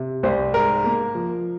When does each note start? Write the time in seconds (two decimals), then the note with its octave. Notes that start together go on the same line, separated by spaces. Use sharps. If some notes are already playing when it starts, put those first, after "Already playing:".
Already playing: C3
0.23 C2 C5
0.54 G#2 A#4
0.84 A#3
1.15 F3